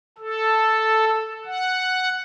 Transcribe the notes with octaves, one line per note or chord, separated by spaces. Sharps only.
A4
F#5